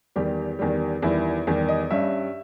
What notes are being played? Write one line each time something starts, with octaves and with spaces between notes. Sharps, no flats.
E2 D#3 G3 G4
E2 D#3 G3
E2 D#3 G3 E4
E2 D#3 G3 G4
D#5
G2 G3 C#4 E5